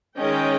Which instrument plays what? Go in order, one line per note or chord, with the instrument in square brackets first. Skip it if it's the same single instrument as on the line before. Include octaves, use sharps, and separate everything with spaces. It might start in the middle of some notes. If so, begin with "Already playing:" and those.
[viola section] D#3 G#3 C#4 D#5 G5